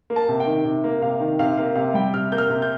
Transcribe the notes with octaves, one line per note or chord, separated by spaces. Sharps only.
A#3
A5
C3
G5
D#3
C3
A#3
C3 F5
D#3
C3 F5
A#3 F5
C3 F5
G3 G5
C3 F6
A#3 G6
F6
C3
G6